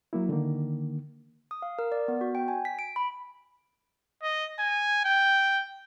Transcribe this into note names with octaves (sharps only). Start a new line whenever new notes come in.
F#3 A#3 E4
D3 D#3 A#3
D#6
F5
A#4
D5
B3
F#4
G5
G#5
B6
D7
B5
D#5
G#5
G5